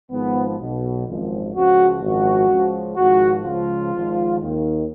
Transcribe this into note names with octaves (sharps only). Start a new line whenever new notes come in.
G#1 G#2 F3 B3
B1 B2
G#1 F#2 F3
C#2 C#3 F3 F#4
G#1 F#2 F3 F#4
C#2 C#3 F3
G#1 G#2 F3 F#4
C#2 C#3 F3 F4
G#1 G#2 F3
D#2 D#3